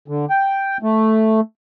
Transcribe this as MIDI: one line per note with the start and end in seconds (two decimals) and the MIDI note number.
0.08 0.25 50
0.30 0.77 79
0.82 1.40 57